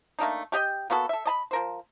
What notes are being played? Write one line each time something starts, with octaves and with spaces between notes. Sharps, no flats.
A3 A#3 D4 D#4
A3 G4 D#5 G5
A#3 B3 F#4 A4
A4 E5
D#5 A5 B5
F3 A#4 C5